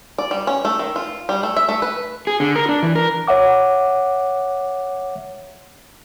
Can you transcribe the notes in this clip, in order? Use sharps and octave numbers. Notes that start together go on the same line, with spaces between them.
D5
G3
C#4
A3
D#3
F4
G3
A3
E5
A3
B4
G#4
D3
A#4
D4
E3
A#4
C#5 E5 F#5 D6